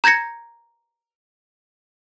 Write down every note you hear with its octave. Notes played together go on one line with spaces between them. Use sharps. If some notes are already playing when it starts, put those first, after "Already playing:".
A#5 G6 G#6 A#6 C#7